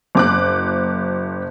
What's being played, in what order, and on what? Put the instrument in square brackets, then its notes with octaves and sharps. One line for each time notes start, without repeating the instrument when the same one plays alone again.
[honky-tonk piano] F#1 D6 F#6